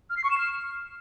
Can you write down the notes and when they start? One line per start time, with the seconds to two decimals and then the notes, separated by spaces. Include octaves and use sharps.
0.10 F6
0.17 C7
0.24 C#6
0.31 E7
0.38 F6